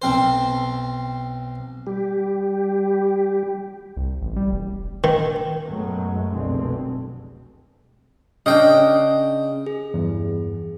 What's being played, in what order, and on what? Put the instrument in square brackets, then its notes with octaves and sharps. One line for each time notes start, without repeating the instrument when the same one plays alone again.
[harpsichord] B1 C4 C5
[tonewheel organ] G3 G4
[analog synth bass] C2
A1
G3
E1
[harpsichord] D#3
[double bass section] F#2 B2 F#3 G#3 A3
F1 C2 B2 D3 G#3 C4
[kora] C#3 D4 [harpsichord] D#5 G5
[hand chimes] G#4
[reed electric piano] E2 G2